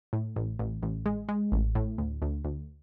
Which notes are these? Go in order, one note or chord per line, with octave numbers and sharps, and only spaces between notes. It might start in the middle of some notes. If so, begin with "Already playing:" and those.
A2
A1
A1
A1
G#3
G#3
A1
A2
D2
D2
D2